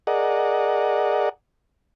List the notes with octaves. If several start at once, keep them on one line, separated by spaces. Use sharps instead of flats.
G#4 A#4 D5 D#5 F#5